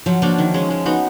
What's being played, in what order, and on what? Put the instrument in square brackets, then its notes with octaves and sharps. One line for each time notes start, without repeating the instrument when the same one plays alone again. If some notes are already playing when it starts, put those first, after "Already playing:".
[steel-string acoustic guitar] F3 [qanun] F#3
[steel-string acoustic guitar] F3 [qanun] A#3 D4 F#4
[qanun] D#3
G#3 C#4
G#3
B3 D#4 F#4